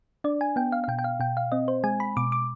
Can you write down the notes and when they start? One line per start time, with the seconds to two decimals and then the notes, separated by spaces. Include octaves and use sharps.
0.24 D4 D5
0.41 G#5
0.56 B3 G5
0.72 F5
0.84 F5
0.88 B2 G5
0.99 G5
1.04 F5
1.20 B2 G5
1.37 F5
1.52 C4 D#5
1.68 C5
1.84 G#3 G#5
2.00 B5
2.17 B2 D6
2.32 D6